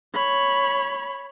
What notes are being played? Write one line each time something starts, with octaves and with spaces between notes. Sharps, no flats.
C#5 B5